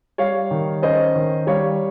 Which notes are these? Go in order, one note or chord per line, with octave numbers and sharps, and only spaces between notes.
G3 C#5 F5
D#3
C#4 C5 D#5
D#3
G3 C#5 F5